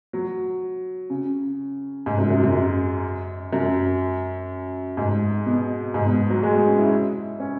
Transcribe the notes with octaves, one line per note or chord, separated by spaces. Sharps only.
F#3
C#3
G#2
F#2
F#2
F#2
F#2
G#2
B2
G#2
B2
F#3
G#3
C#4
E4
C#4